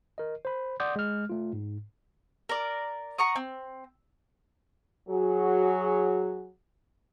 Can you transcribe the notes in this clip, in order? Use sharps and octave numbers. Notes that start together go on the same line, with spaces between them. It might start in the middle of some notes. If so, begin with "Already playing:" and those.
A#4 D#5
C5 B5
D5 F#5 C6 D6 D#6 G6
G#3 F6
A3 F4
G#2
A#4 D5
F#5 A#5 C#6 D#6
C4
F#3 F#4 G#4